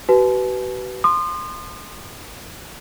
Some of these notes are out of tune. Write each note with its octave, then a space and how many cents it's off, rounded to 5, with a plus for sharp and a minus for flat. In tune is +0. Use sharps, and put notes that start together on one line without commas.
F#4 +40 B4 +0 A5 -45
C6 +0 D#6 -40